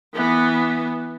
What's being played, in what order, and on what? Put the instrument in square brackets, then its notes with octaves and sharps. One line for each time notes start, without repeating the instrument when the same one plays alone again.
[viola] E3 B3